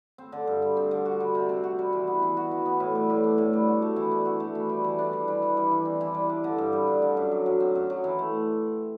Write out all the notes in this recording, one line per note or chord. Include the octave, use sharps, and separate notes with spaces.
C4
D3
G2
G3
C4
D3
F#4
G3
C3
C4
F#4
G3
E3
B3
E3
F#4
E3
B3
A2
G3
A2
D4
A2
G3
F#4
A3
E3
D4
F#4
A3
E3
G3
E3
D4
E3
G3
E3
G3
E3
C4
E3
G3
D4
D3
G2
G3
D4
D3
F#2
F#3
F#2
C4
F#2
F#3
E3
A3